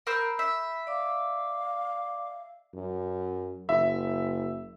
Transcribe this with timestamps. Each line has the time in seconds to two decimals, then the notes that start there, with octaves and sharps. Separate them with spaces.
0.07 A#4 C5 B5 E6
0.39 E5
0.87 D5 F5 D6
2.74 F#2
3.69 F#1 E5